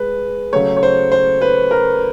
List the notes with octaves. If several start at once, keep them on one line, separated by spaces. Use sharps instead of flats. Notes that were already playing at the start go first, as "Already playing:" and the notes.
Already playing: G#3 B4
C#3 F#3 A3 C#5
C#5
C5
C5
B4
A#4